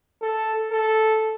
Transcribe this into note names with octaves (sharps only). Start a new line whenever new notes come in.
A4
A4